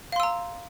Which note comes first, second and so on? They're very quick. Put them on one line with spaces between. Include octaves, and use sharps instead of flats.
F5 C6 E6 A#5